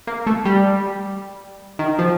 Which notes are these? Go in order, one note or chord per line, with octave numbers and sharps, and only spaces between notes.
A#3
A3
G3
D#3
F3